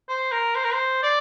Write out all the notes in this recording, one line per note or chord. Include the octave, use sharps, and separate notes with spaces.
C5
A#4
C5
A#4
C5
D5